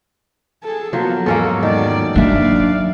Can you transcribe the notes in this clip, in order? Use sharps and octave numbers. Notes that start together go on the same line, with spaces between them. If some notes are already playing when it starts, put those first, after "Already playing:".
G#4 A4
F3 F#3 A#3 B3
E2 G#2 G#3 A#3 C#4 A4
D#3 F#3 D5
F#3 A#3 D4 D5 E5 F5